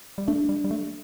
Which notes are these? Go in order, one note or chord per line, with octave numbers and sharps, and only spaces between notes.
G3
A3 D4
G3
G3
A3